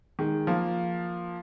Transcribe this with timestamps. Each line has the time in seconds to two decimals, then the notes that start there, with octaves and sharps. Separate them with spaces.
0.19 D#3 G#3
0.47 F3 A#3